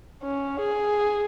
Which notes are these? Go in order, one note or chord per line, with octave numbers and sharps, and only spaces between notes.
C#4
G#4